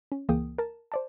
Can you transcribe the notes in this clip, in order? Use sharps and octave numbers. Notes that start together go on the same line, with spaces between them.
C#4
C#2 E3 A#3 G#4 G5 D#6
A#4 A5
C5 D5 A5